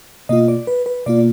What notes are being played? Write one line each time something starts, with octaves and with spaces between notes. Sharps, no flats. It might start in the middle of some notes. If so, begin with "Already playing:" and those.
B2 A#3 F4 D#5
D5
B4
B4
B2 A#3 F4 D5